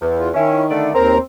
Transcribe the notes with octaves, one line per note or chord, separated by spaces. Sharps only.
E2
F4
D#3 C#4 E4
D3 A3 D5
D#2 C4 A#4 A#5